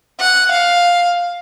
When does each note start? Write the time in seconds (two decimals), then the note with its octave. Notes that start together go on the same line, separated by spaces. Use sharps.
0.20 F#5
0.51 F5